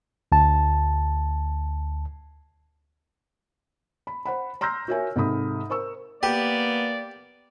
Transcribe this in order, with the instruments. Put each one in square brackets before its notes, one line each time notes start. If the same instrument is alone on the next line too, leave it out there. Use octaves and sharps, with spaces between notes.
[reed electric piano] D2 A5
[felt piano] B5
C5 F#5 B5
A#5 C6 E6 F6 G6 A#6
F#4 A#4 C#5 E5 G#5
G#2 C3 A4 B5 D#6
A#4 C5 C#6 E6
[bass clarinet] A#3 [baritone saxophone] B3 [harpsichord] G4 [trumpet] D5